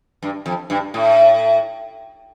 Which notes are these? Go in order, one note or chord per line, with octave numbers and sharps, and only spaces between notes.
G2
F2
G2
A2